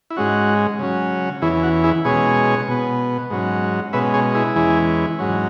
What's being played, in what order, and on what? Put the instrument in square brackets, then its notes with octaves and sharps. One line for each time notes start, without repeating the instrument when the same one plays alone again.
[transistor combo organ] E4
G#2 G#3 C#4 F#4
C#3 F#3 C#4
E2 E3 C#4 E4 G#4
F#4
E4 G#4
B2 G#3 C#4 G#4 C#5
B2 B3
G#2 F#3 C#4
B2 G#3 C#4 B4 E5
G#4 C#5
E4 G#4
E2 E3 G#3 C#4
G#2 F#3 C#4